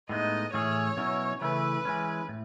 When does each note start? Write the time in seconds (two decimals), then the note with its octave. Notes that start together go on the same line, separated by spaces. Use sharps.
0.09 A2 G#3 B3 D#4 D#5
0.54 A2 E3 A3 C#4 G#4 C#5
0.97 B2 F#3 C#4 E4
1.41 C#3 E3 A3 E4 B4
1.85 E3 G#3 C#4
2.29 A2